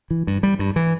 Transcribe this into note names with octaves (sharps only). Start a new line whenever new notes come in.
E3
G2
G3
G2
E3